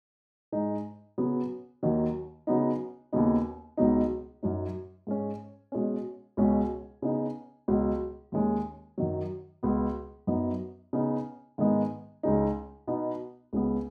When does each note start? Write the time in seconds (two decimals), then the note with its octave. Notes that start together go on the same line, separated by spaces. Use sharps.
0.52 G#2 G#3 D#4
1.18 C#3 F#3 B3
1.83 D#2 D#3 F#3
2.47 C#3 F#3 B3 D#4
3.13 D#2 C#3 F#3 B3 D#4
3.77 C#2 B2 F#3 B3 D#4
4.43 F#2 F#3 D#4
5.07 G#2 G#3 C#4
5.72 B2 G#3 C#4
6.37 C#2 B2 G#3 C#4
7.02 C#3 B3 D#4
7.68 C#2 B2 F#3
8.32 D#2 D#3 G#3 C#4
8.98 F#2 D#3 F#3
9.63 C#2 B2 B3
10.27 F#2 F#3 B3 D#4
10.93 C#3 B3 D#4
11.58 G#2 D#3 G#3 B3 D#4
12.23 C#2 C#3 G#3 D#4
12.87 B2 B3 D#4
13.53 C#2 C#3 B3